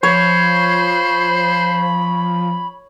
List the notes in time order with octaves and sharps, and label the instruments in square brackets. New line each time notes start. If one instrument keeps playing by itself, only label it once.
[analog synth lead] F3 [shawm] C5 [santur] C#5 [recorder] B5